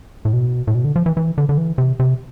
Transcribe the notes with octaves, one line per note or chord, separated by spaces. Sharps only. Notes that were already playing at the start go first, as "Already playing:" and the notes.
A2
B2
A2
B2
D3
F3
E3
E3
D3
D3
E3
C3
C3